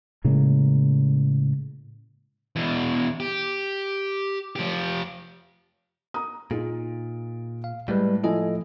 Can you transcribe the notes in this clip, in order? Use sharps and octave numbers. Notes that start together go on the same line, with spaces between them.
A2 C#3 G#3 A#3
E2 B2
G4
F3 G4
A#5 D#6
A#2 D#4 F4 G#4
F5
A2 G3 G#3 B4
F3 E4 F4 A4 D#5 G#5